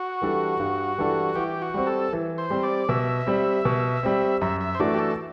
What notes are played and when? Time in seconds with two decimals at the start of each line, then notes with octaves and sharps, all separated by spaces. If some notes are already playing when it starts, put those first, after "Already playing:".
Already playing: F#4
0.22 E3 G3 D4 A4
0.60 G2
0.98 E3 G3 D4 A4
1.36 E3 G4
1.62 F#4
1.74 G3 C4
1.87 A4
2.13 E3
2.38 C5
2.50 G3 C4
2.63 D5
2.89 B2 E5
3.27 G3 C4
3.65 B2
4.03 G3 C4
4.42 F#2 E5
4.61 E5
4.75 C5
4.79 E3 A3 D4 F#4 D5
4.94 G4
4.99 A4